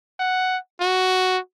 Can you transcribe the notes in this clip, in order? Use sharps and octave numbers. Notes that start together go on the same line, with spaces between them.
F#5
F#4